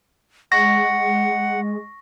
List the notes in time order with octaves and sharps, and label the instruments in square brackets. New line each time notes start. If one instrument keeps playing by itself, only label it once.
[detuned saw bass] G#3 [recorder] F#5 [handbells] C#6 A#6